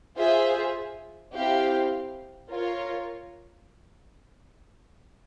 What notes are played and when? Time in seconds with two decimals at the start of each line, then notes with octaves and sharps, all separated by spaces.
0.17 F4 G#4 C5 E5
1.34 C4 E4 G4 C5 F5
2.51 F4 A#4 C#5